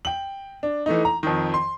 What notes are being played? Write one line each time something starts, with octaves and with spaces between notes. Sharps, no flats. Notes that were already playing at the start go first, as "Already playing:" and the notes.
G5 F#7
D4
E3 A3 D#4
A#5
F2 D#3
C6